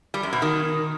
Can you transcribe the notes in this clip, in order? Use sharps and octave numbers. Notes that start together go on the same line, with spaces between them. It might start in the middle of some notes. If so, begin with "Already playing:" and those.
G3
F#2
B2
D#3